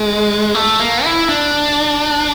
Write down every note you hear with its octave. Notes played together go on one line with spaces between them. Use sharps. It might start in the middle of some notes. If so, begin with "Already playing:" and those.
Already playing: G#3
A3
A#3
E4
D4